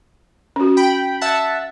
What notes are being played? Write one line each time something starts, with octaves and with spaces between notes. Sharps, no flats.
C#4 F#4
G5 B5
E5 F#5 A5